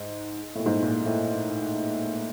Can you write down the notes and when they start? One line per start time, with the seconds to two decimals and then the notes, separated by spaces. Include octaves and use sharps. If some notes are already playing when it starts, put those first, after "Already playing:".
Already playing: G#2
0.55 A2
0.59 A#2
0.66 G#2
0.71 A2
0.82 A#2
1.05 A2